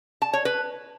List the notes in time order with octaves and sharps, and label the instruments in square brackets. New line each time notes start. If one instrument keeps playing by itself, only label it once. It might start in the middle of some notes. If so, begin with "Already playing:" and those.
[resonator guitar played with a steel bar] A5
C#5
B4